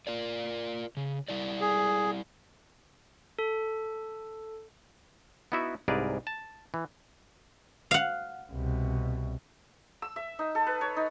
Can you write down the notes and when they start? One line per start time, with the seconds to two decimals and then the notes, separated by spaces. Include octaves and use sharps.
0.07 F4 A#4 D5
0.97 C#3
1.29 G3 E4 D5
1.61 G#4
3.39 A4
5.52 B3 D#4 E4 F#4 E5
5.88 C2 G#2 G#4 A#4 B4 D5
6.27 A5
6.74 E3
7.91 F5 F#5
8.52 C2 B2
10.02 E6
10.16 E5
10.39 D#4
10.55 A4
10.67 B4
10.81 C#5
10.97 D#4